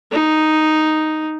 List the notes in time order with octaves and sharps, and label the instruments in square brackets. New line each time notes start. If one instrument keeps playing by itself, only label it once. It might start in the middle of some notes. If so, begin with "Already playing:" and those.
[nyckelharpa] D#4